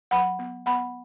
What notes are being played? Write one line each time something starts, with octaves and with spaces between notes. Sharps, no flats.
F#3 F#5 B5
B3
B3 F#5 B5